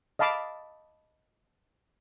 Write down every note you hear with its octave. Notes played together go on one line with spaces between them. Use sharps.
D#5 F5 A5 B5 D6